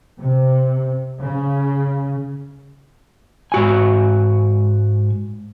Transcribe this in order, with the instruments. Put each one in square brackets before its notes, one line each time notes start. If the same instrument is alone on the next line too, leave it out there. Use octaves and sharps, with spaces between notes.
[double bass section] C3
C#3
[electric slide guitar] G#2 F#4 G#5